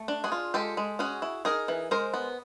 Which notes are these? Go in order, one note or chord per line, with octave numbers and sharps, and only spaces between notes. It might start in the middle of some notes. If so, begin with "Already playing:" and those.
Already playing: A3
D4
F#4 G#4
F4
G#3 G4 A4
G#3
C#4 F#4 G#4
E4
D#4 G#4 A#4
E3
G#3 A#4 C5
B3